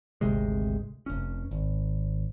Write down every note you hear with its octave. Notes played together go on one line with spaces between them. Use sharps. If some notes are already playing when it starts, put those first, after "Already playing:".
G#1 D2 C3 G#3
F1 C#4
G#1